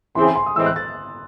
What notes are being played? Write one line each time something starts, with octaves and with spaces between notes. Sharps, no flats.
C#3 E3 C4 E4 G#4 C6
G#5
C6
D#6
A2 E3 G#3 C4 E6
F#6
A6